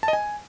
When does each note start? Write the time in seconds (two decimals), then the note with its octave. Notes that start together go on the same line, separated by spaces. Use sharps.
0.03 A5
0.08 D#5
0.13 G#5